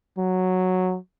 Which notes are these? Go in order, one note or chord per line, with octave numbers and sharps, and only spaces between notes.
F#3